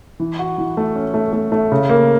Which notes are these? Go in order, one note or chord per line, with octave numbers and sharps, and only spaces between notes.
E3
F#4
E3
A3
C#4
A3
A3
A3
C#3
A#3